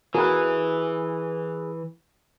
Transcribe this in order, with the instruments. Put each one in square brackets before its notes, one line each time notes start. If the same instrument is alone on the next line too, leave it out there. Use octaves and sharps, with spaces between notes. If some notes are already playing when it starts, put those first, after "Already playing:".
[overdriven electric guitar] E3 [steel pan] F#4 A#4 [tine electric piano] G#4 B4